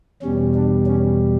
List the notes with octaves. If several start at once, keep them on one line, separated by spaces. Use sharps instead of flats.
E2 B2 G3 C#4
D4
C#4